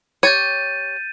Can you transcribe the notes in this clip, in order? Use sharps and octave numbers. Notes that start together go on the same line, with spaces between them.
G4 C#5 G6 A6 D#7